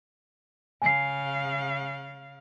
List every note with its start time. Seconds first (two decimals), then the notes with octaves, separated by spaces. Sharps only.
0.82 C#3 F5 G#5 C7